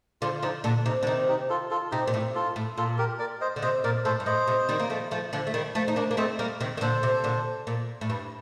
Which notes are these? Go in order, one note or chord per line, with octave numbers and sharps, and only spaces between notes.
D3 F3 F4
F4
D3 F3 D#4
A#2 D3 D4
C3 D#4
D3
C3 D#3 D#4
D#4 G4
F4 A4
F4 A4
C3 D#4 G4
A#2
A2
F4 A4
A2
A#2 F4 A4
G4 A#4
A#4 D5
C5 D#5
D3
C3 C5 D#5
A#2 A#4 D5
A2 A4 C5
G2
A2 C5 D#5
C3
D#3 G3
A#3
F3 A3
F3 A3
D3 F3
A3
D#3 G3
F3 A3
D#4
A#3 D4
A#3
A3 C4 C5 D#5
G3 A#3 A#4 D5
C3 D#3
D#3
A#2 D3 A4 C5
C3
A#2 D3
A#2
A2
G2